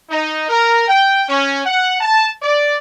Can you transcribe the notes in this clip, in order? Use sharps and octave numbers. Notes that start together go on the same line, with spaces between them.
D#4
A#4
G5
C#4
F#5
A5
D5